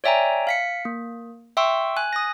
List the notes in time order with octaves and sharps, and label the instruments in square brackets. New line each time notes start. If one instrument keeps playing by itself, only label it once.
[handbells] C#5 D5 E5 G5 G#5 A#5
F5 B6 C#7
A#3
E5 G5 C6 C#6 E6
G#5 F#6
D#6 A#6